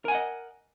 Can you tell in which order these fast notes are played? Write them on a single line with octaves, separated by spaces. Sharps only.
A#4 G#5 F#5 D#5